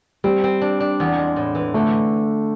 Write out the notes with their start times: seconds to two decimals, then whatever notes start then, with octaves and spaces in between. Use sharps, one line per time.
0.24 G3 C4
0.44 C4
0.61 D4
0.80 D4
1.00 E2
1.18 G#3
1.36 A2
1.55 E3
1.74 D3 A3